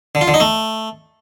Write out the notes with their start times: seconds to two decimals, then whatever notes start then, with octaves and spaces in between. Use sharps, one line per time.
0.15 D3
0.21 F4
0.28 D3
0.34 D#4
0.40 A3